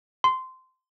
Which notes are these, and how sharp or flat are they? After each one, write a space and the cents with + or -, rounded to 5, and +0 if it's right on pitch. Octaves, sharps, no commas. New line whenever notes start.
C6 -15